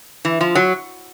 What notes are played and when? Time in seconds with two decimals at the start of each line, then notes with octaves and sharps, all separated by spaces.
0.25 E3
0.41 F3
0.55 F#3